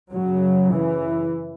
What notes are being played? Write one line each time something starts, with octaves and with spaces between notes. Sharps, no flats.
F#2 C#3 F#3
E3